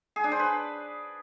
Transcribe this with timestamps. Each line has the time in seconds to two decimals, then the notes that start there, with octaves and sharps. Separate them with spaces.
0.16 G#4
0.24 D4
0.32 C5
0.39 B4